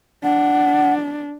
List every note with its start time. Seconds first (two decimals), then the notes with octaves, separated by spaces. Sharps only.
0.24 D4 F#5